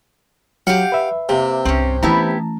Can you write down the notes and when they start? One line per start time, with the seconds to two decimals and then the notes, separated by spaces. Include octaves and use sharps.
0.67 F#3 G4 F5 F#5
0.92 B4 E5
1.29 C3 A#3
1.65 C2 G2 C4 C#4
2.03 E3 A3 B3 C#4 E4 G4 A5 A#5